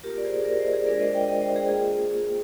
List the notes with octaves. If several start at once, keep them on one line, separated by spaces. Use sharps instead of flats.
A#3 F4 G4 A#4
D5
G#4 C5
A#4 D5
C5 D#5
G#4 C5
G#3 D4 F4 A#4 D5
C5 D#5
D#5 G5
D#5 G5
C5 D#5
G#4 C5
A#3 F4 G#4